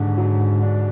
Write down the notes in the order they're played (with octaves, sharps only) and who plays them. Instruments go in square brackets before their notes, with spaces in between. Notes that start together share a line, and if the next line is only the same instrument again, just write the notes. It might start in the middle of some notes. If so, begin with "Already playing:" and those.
Already playing: [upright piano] D#2 D3 [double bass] G#2
[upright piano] F#3
D4